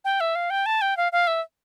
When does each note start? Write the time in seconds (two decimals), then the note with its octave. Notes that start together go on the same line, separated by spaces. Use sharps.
0.05 G5
0.20 E5
0.35 F5
0.50 G5
0.66 A5
0.81 G5
0.97 F5
1.12 F5
1.27 E5